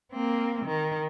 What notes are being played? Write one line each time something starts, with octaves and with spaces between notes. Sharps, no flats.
A#3 C4
D#3